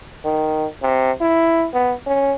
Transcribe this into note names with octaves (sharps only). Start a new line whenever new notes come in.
D#3
C3
E4
B3
C#4